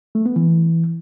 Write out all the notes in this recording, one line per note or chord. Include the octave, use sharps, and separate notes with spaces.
A3
B3
E3